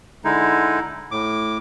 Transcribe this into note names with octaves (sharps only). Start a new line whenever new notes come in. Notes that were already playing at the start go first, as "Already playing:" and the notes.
D3 G#3 D#4 E4
A2 D6